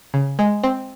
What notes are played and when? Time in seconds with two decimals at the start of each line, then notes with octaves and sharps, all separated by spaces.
0.14 C#3
0.39 G#3
0.64 C4